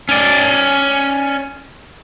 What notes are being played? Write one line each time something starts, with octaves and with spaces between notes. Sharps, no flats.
C#4 D5